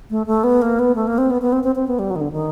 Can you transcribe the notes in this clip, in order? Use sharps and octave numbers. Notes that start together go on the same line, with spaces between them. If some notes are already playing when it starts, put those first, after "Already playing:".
A3
A3
B3
A#3
B3
A3
A#3
C4
B3
B3
C4
C4
C4
B3
G3
F#3
D#3
D3
D#3